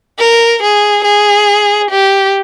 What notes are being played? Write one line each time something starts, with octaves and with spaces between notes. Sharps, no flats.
A#4
G#4
G#4
G4